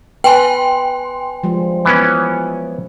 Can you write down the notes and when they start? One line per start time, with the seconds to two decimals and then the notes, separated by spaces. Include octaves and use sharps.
0.24 B4 G5 G#5 C6
1.43 F3 G3 G#3
1.85 E3 B3 C#4